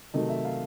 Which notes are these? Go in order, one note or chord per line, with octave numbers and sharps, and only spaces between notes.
C3 D#3 F#3 A3 D#5
E5
F5